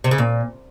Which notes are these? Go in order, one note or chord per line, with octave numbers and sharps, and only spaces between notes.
C3
C#3
A#2